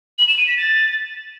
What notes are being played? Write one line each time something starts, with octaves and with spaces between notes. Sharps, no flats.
F#7
E7
D#7
B6
A6